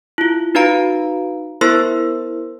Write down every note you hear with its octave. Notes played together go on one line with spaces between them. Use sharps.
E4 F4
D#4 F#4 B4 F5 A#5 D7
B3 E4 A#4 C5 C6 E6